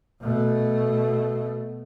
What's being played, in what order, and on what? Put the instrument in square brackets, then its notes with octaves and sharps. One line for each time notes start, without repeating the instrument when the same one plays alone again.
[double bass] B2 A3